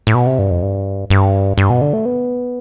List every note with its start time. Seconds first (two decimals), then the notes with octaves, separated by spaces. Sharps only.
0.07 A2
0.15 B2
0.27 C3
0.39 G2
0.51 F2
0.62 G2
1.10 G2
1.58 G2
1.70 B2
1.82 D3
1.93 A3
2.06 B3